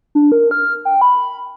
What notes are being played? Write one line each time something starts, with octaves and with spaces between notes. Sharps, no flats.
D4
A#4
F6
G5
B5